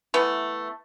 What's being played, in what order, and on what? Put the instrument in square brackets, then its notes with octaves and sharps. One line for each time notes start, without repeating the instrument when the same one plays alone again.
[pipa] E3 A3 B3